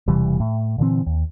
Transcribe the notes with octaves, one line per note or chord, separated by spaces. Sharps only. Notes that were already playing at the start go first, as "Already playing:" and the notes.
E1 C3 E3 G3
A2
A#2 D3 E3 C4
D#2